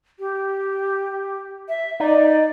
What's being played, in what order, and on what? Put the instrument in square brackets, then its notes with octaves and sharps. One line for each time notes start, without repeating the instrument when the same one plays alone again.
[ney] G4
E5
[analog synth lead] D#4 [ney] D5